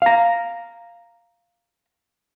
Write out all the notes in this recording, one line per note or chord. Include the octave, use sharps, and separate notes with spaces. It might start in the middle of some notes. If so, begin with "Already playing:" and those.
F5 A#5